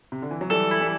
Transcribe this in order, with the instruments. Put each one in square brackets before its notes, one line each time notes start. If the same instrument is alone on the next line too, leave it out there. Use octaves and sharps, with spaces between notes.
[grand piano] C3
D3
E3
F#3
[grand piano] E3 G3 [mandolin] A4
[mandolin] E4
[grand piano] E3 G3